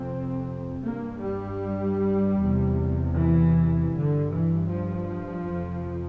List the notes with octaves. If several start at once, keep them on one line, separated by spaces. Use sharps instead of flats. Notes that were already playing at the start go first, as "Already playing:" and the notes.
Already playing: F2 C3 C4
G2 A#3
G3
E2 C3
E3
G2 D3
E3
F3
F2 C3